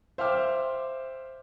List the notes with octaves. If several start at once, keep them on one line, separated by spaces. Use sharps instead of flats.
C5 E5 F5 G5 D6 F6